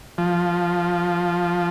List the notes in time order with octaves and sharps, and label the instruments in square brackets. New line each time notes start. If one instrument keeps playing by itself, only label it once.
[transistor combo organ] F3